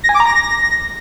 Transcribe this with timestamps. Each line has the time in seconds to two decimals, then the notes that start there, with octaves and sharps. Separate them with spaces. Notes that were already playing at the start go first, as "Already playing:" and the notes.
0.04 A#6
0.09 G#5
0.15 D6
0.20 A#5
0.26 A#6